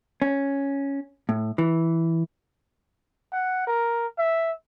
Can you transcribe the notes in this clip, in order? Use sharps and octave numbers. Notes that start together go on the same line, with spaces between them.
C#4
A2
E3
F#5
A#4
E5